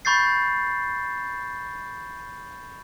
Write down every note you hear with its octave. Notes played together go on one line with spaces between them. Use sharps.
B5 C#6 G6 A6 C7